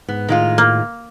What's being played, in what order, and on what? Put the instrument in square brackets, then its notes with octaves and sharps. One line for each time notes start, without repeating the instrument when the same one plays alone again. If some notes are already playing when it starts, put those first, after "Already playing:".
[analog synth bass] G#2 [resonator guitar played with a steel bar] B3
[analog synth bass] A2 [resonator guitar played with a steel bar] D#3 G#3 F4
[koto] A#3